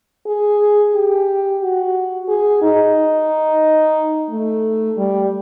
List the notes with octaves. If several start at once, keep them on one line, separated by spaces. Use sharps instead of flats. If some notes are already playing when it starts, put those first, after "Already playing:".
G#4
G4
F#4
G#4
D#4
A3
G3